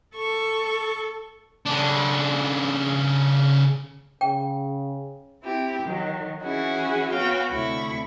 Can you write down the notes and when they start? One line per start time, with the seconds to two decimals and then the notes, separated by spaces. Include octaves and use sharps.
0.15 A4 C#6
1.66 C#3 D4
4.21 C#3 G5
5.42 C4 E4 G4
5.83 D#3 F#3
6.42 E3 C#4 E4 F#4 G#4
7.12 B3 F#4 C#5 F5 G5
7.50 D2 C3 E4 B5 C#6